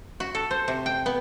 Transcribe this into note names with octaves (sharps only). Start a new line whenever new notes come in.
F#4
A4
C5
C3
G5
B3